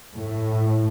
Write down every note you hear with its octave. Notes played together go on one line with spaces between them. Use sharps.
A2